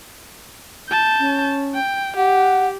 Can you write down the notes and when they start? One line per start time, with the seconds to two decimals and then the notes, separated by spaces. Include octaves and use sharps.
0.89 A5 G6
1.19 C#4
1.75 G5
2.17 G4 F#5